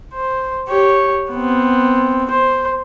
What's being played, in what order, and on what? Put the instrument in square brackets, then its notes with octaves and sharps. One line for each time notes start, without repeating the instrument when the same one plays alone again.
[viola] C5
G4 C#5
B3 C4
C5